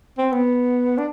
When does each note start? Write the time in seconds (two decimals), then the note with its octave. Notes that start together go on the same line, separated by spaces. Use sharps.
0.18 C4
0.32 B3
0.98 D4